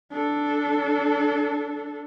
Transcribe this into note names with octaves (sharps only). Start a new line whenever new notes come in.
D4 A4